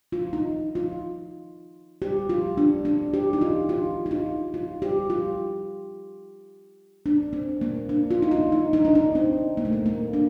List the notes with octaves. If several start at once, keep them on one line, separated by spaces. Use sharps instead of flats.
F4
D#4
F4
G4
F4
D4
D4
G4
D#4
F4
F4
D#4
F4
F4
G4
F4
D4
C4
A#3
D4
F4
D#4
F4
D#4
D#4
D4
D#4
C4
A#3
A3
A#3
A#3
D4